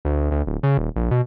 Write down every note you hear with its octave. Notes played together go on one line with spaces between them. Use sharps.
D2
D2
D1
C#3
D#1
A#1
B2